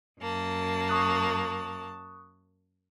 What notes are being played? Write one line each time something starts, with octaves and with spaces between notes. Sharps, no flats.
F#2 A#3 A5
C#6 D#6 F#6